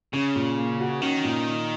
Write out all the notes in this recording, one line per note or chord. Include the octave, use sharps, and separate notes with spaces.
C#3 C#4
A#2
A#3
F#4
D#3 C#4
A#2